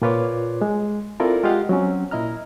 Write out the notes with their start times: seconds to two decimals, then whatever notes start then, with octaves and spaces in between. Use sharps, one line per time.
0.02 A#2 A#3 F4 B4 C#5 D6
0.61 G#3
1.20 C4 E4 F4 A4 A#4 D5
1.43 G#3 F4 G4 D#5 F5 F#5
1.69 F#3 C4 C#4
2.11 A#2 E4 D#5 A#5 F6